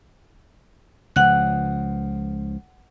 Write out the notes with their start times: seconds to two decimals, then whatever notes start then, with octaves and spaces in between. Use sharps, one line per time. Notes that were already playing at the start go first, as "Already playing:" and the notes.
1.16 C#2 F3 F#5 F#6